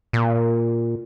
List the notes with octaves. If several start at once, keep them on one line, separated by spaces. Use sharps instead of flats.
A#2